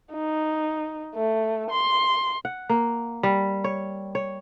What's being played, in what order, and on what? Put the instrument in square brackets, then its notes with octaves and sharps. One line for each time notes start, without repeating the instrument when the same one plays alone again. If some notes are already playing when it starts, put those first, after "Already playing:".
[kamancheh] D#4
A3
C6
[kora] F#5
A#3
G3
C#5
C#5